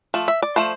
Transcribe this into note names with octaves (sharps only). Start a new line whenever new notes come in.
F3 A3
E5
D5
F3 A3 C5